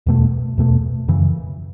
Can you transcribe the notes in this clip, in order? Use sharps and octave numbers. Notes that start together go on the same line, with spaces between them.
E2 B2 A3
E2 B2 A3
F#2 C#3 E3